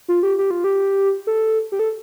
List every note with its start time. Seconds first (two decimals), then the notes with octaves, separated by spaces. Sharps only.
0.08 F4
0.23 G4
0.38 G4
0.51 F4
0.64 G4
1.27 A4
1.72 G4
1.79 A4